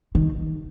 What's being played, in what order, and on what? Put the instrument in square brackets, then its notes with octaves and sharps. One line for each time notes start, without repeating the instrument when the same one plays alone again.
[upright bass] D#3